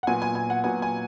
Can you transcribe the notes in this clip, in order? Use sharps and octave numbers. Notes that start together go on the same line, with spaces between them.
F#5
A#2 F#3 B3 G#5
G#5
G#5
F#5
A#2 F#3 B3 G#5
G#5